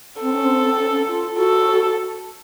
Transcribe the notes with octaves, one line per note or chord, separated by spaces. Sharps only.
C4 A4
C#4
C4
C#4
F4
F#4 A4